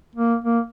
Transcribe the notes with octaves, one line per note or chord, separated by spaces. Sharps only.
A#3
A#3